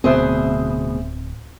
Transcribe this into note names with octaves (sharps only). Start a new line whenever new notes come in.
D1 D2 B2 C4 G#4 C5 E5